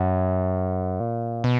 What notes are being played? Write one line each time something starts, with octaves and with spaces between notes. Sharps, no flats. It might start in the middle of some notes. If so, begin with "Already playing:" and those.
Already playing: F#2
A#2
B2